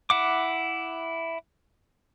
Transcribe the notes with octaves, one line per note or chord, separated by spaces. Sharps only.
E4 F#5 D6